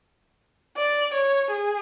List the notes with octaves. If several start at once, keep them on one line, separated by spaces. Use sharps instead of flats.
D5
C#5
G#4